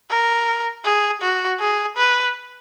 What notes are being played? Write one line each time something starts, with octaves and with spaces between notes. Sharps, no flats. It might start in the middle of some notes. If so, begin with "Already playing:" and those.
A#4
G#4
F#4
G#4
B4